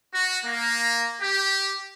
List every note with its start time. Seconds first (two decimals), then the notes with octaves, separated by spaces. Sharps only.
0.14 F#4
0.45 A#3
1.21 G4